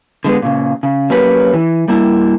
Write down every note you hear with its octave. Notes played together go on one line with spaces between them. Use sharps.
D3 G#3 B3
A#2 C#3
C#3
F#3 A#3 C#4 G4 B4
E3
G3 A#3 E4